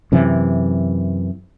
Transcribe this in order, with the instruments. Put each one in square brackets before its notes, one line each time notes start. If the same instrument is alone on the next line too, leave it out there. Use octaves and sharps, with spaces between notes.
[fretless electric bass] F#2 C3 E3